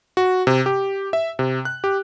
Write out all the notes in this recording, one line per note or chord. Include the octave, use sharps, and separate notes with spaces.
F#4
C3
G4
E5
C3
F#6
G4